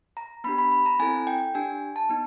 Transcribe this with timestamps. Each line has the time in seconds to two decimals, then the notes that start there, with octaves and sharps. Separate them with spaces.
0.17 A#5
0.44 B3 D4 G4 B5
0.58 B5
0.72 B5
0.86 A#5
0.99 C4 E4 A4 G#5
1.27 G5
1.54 D4 G4 G#5
1.96 A5
2.09 B3 D#4